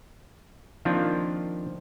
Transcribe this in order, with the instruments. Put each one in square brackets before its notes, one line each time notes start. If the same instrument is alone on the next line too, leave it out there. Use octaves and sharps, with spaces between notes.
[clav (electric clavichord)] D#3 F3 A#3 C4 D4 F4